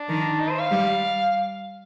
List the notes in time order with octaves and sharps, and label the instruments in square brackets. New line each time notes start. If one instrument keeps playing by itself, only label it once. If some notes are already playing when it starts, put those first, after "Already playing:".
Already playing: [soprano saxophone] D4
[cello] D#3
[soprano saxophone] D#4
C5
F5
[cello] G3